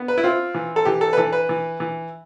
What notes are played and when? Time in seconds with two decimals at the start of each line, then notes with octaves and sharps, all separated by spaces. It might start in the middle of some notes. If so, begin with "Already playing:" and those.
Already playing: B3
0.08 B4
0.18 E4
0.24 C4 F4
0.54 E3
0.76 A4
0.85 E3 G4
1.01 A4
1.13 B4
1.17 E3 A4
1.33 B4
1.49 E3
1.80 E3